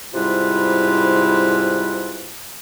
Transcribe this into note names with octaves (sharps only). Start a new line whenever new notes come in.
G#2 C3 G3 E4 F4 B4